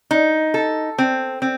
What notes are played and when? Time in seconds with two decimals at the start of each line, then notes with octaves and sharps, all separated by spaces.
0.11 D#4
0.54 A4
0.98 C4
1.42 C4